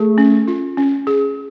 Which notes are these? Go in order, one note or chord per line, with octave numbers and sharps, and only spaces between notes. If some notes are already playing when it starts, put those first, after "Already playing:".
Already playing: A3 G#4
C#4
F4
C#4
G#4